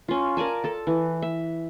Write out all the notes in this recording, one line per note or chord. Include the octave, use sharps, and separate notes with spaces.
C#4 F4
A#4 D5 G#5 A5
A4 A5
E3
E5